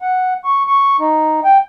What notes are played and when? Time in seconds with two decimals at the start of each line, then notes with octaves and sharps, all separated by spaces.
0.02 F#5
0.44 C#6
0.67 C#6
1.00 D#4
1.44 G5